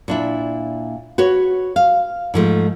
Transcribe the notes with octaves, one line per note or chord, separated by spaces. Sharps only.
A#2 D4 E4
F#4 B4 C#5
F5
G#2 F3 A3